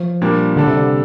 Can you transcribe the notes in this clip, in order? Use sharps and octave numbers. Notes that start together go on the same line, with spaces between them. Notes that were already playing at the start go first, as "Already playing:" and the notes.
Already playing: F3
A#2 G3 A#3 D4 G4
D3 G3 D4 A4
C3
D3